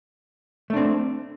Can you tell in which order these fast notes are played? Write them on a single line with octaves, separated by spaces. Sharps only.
A3 D4 C4